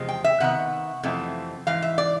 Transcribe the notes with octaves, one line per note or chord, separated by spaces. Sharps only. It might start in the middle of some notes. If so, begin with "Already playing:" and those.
Already playing: E2 C3 F3 G#3 C4
G5
E5
C3 D#3 B3 F#5
F2 C3 E3 A3 C4
G#2 E3 F5
E5
D5